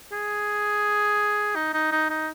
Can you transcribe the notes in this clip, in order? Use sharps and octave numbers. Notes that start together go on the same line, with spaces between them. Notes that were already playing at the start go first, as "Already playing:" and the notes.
G#4
D#4
D#4
D#4
D#4